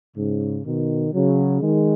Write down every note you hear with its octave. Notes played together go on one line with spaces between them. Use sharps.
G#2 C#3
B2 D#3
C#3 F#3
D#3 G#3